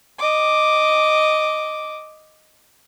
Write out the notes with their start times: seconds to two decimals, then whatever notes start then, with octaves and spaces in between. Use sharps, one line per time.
0.19 D#5 D6